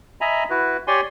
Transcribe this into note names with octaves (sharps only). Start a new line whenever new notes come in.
D#5 E5 G#5 A#5 B5
E4 F#4 B4
G4 C#5 D5 G#5 C6